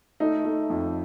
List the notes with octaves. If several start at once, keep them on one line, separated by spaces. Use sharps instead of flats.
A3 D#4
A3
F2